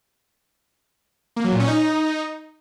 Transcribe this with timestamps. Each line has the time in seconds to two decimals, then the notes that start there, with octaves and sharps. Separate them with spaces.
1.36 A#3
1.44 F#3
1.52 A#2
1.60 C#4
1.68 D#4